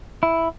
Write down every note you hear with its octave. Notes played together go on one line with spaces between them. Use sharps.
E4